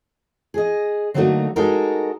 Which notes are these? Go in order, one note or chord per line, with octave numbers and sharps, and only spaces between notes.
G#4 D#5
D3 F#3 A3 A#3 D#4 F#4
G#3 D#4 F#4 A4 A#4